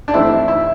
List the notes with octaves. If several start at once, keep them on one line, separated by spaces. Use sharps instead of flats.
D4
E3 A3 C4 E4
E4